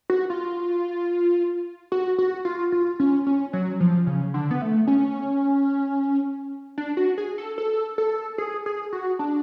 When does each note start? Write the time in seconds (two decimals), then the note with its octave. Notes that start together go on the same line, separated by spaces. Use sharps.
0.10 F#4
0.30 F4
1.92 F#4
2.18 F#4
2.45 F4
2.72 F4
3.00 C#4
3.27 C#4
3.53 F#3
3.80 F3
4.07 C#3
4.34 D3
4.51 B3
4.62 A3
4.87 C#4
6.78 D4
6.97 F#4
7.18 G#4
7.38 A4
7.58 A4
7.98 A4
8.38 G#4
8.66 G#4
8.93 F#4
9.19 D4